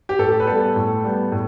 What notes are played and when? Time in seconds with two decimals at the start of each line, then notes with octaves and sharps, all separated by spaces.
0.09 G4
0.19 A2 A4
0.40 B4
0.47 G3 B3 A4
0.76 A2
1.04 G3 B3
1.32 A2